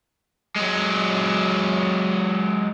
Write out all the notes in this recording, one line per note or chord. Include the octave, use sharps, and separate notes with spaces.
F#3 G#3